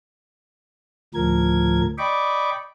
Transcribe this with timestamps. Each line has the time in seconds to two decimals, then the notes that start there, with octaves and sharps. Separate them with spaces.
1.14 D2 A2 F3 A#4 G#6
1.98 D5 D#5 G5 B5 C#6 D6